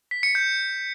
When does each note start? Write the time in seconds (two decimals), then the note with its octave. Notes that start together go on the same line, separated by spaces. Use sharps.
0.11 B6
0.23 C#7
0.35 G6